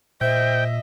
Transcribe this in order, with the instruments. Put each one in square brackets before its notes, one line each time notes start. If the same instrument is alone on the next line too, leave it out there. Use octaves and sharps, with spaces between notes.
[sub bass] A#2 [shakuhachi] C5 [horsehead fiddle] D#5 E5 [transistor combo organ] G5